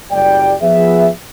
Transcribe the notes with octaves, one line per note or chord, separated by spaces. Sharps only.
F#1 G3 D5 G5
F3 B3 G#4 E5